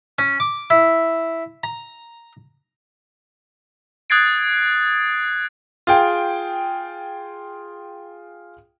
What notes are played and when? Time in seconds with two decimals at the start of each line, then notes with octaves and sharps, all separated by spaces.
0.19 C#4
0.40 D6
0.70 E4
1.63 A#5
4.10 D#6 F#6 G#6 A6 C7 D7
5.87 F4 G#4 G5